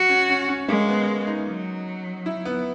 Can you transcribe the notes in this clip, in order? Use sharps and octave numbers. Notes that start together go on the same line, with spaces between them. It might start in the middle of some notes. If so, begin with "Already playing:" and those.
Already playing: F#4
C#4
C#4
C#4
G#3 A#3
B3
D#4
F#3
E4
B3